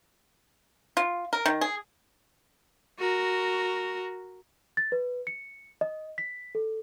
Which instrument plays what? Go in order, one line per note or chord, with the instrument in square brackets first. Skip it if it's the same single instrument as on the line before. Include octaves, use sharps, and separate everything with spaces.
[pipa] F4
A#4
D#3
G#4
[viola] F#4 A#4
[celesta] A6
B4
C#7
D#5
B6
A4